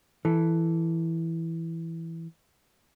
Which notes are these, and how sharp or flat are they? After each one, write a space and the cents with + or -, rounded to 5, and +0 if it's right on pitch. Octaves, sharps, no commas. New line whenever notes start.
E3 +0 A4 +0